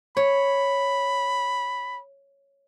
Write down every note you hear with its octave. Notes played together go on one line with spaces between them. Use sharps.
C#5 B5